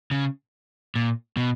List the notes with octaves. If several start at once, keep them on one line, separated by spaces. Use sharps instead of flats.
C#3
A#2
B2